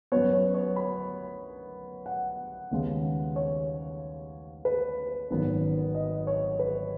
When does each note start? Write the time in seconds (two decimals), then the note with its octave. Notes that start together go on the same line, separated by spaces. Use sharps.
0.12 F#2 F#3 B3 C#5
0.33 C#5
0.54 C#5
0.76 B5
2.06 F#5
2.71 D#2 C#3 G#3 B3
3.36 C#5
4.65 B4
5.30 G#1 F#2 D#3 F#3 B3
5.95 D#5
6.27 C#5
6.59 B4